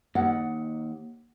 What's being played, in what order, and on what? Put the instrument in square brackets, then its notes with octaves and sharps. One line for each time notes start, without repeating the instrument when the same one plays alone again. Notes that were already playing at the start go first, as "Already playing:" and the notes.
[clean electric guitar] D#2 [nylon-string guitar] F#5